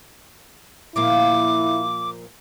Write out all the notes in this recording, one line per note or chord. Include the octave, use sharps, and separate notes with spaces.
A#2 F3 A#3 E4 D6